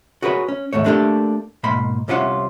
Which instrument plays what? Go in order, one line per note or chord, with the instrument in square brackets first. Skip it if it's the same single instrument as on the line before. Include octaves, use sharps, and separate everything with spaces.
[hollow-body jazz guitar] F#4 G#4 A#4 B4 C#5
C#4
D#2 G#2 A3 C#5
A3 A#3 D4 F4 G4 A4
G#2 B2 A#3 B5 C6
C2 C3 C#4 F4 F#4 F#5